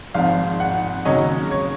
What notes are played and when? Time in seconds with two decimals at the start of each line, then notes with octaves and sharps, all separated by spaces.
0.14 G#1 G#2 F3 F5
0.60 F#5
1.05 D#2 C#3 F#3 C#4 D#5
1.51 C#5